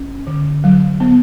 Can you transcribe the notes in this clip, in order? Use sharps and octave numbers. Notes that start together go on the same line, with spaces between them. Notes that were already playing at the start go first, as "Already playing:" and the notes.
Already playing: C#4
D3
F#3
B3